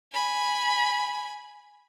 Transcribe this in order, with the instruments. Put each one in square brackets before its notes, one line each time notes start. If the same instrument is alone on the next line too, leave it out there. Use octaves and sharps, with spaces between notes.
[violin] G#5 B5